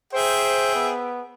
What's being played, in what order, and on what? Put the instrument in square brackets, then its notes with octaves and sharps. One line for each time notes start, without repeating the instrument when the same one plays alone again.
[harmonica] G#4 E5 G5 [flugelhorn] C5
[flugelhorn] B3